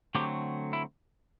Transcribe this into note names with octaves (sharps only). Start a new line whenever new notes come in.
D3 F#3 A3 C4 G4
E4